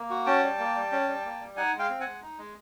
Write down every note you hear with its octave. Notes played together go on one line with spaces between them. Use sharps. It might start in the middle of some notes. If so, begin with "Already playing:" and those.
Already playing: A#3
F#4
C#4 G5 A5
G3
A#3
G3
C#4
G3
A#3
G3
D#4 F#5 G#5
G#3
F5 G5
C4
F#5 G#5
G#3
D#4
G#3